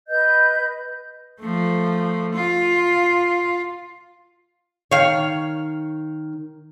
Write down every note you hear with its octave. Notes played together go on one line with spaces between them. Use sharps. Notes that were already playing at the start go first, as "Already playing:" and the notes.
B4 D#5 G6
F3 A3
F4
D#3 C#5 F5